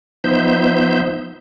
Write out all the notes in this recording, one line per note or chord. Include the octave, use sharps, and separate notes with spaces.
F3 B3 D#4 C5 E5 G6